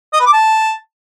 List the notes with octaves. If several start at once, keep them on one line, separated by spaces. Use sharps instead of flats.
D#5
B4
D6
A5